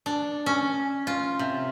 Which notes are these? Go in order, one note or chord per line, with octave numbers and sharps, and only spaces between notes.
D4
C#4
F4
C3